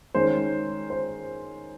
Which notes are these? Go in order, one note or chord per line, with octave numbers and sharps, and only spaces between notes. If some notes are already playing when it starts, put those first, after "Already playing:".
D#3 G#3 C#4 C5
C5